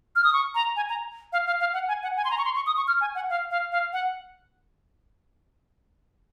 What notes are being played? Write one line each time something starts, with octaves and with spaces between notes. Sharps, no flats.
F6
D#6
C#6
A#5
G#5
A#5
F5
F5
F5
F#5
G#5
F#5
G#5
C6
A#5
C#6
C6
C#6
D#6
C#6
F6
G#5
F#5
F5
F5
F5
F#5